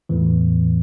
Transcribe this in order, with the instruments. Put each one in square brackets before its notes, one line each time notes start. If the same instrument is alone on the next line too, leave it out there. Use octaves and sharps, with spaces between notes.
[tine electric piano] E2 A2 E3